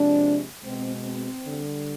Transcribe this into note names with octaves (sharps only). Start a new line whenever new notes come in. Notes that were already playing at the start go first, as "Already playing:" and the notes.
Already playing: C3 F3 G#3 D4
B2 G#3 C4
C4
D3 G3